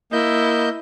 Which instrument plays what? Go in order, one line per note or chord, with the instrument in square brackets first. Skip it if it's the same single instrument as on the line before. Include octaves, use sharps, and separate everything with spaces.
[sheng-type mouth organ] A#3 D#5 G6 [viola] E4